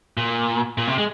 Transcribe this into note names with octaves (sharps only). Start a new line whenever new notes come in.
A#2
A#2
C3
G#3